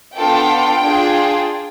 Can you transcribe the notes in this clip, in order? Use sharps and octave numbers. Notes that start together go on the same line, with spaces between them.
B3 D4 F4 A4 G5
D4 F4 G#4